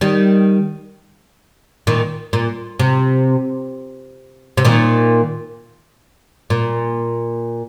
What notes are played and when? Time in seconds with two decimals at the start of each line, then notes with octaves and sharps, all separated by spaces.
0.01 D#3 G3
1.87 A#2 D#3
2.33 A#2
2.79 C3
4.57 C3
4.65 A#2 D#3
6.50 A#2